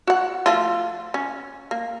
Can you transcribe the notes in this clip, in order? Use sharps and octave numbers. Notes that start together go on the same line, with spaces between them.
F#4 F#5
F3 A3 F4
C#4
A#3